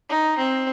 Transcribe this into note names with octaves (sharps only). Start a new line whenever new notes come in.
D#4
C4